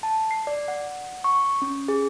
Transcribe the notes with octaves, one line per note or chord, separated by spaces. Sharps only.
A5
C7
D5
F#5
C#6
C#4
G#4